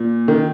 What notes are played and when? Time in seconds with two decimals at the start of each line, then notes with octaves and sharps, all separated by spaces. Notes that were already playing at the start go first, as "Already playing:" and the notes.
Already playing: A#2
0.28 D#3